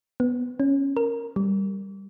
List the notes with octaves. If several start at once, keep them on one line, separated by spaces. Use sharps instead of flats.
B3
C#4
A#4
G3